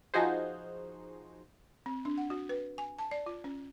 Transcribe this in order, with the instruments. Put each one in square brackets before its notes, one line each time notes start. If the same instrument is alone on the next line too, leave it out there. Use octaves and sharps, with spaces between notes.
[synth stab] F3 D#4 F#4 G#4 C5
[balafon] C4
D4
F#5
F#4
B4
G#5
A5
D5
F4
C#4